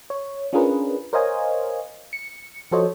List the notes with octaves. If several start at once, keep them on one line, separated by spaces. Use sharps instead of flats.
C#5
C#4 D4 F4 G#4 A#4 B4
A#4 C5 C#5 D#5 F5 G#5
C#7
F3 F#4 A4 C5 C#5 D#5